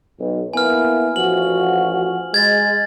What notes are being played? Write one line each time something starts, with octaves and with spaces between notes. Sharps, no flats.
B1
A#3 B3 E4 G#5 F6
A1 F3 F#4 F#7
G#3 G#6 A6